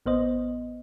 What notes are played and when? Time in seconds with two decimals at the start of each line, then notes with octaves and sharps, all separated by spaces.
0.06 A1 B3 C5 D#5